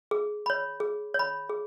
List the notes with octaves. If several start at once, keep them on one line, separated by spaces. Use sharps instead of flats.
G#4
C#5 B5
G#4
C#5 B5
G#4